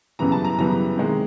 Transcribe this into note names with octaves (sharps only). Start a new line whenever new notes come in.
F#2 C#3 E3 G3 B3 A#5
A5
A#5
F#2 C#3 E3 G3 B3 A#5
C3 D#3 G#3